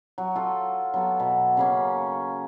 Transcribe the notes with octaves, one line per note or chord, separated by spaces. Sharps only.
F#3
F4 A4
F#3 B3 A4
B2
C#3 A#3 C#4